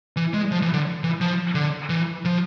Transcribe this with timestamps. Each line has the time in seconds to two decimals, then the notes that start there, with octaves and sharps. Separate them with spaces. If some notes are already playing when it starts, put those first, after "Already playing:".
0.16 E3
0.34 G#3
0.51 F3
0.62 E3
0.73 D3
1.04 E3
1.21 F3
1.55 D3
1.89 E3
2.25 F3